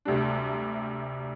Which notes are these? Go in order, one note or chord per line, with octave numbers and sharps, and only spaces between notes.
D2 C3 G3 D4